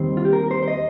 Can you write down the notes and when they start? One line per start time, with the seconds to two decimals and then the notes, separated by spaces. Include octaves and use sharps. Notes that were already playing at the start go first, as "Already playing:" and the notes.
Already playing: D#2 D#3 G3 C4 C5
0.17 F4
0.25 G4
0.33 A#4
0.51 C5
0.63 C5
0.68 D#5